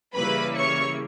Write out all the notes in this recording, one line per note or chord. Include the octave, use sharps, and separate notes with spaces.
C#3 E3 G3 A#3 E4 B4 B5
C#5 C#6